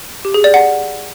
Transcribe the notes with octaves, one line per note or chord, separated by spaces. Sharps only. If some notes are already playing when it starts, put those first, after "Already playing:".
G4
G#4
D5
F#5